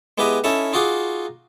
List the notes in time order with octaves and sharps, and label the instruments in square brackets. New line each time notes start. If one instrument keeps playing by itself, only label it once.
[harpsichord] G#3 B3 E4 G4 B4 D#5
C#4 D#4 E4 A4 E5
D#4 F4 F#4 G#4 D6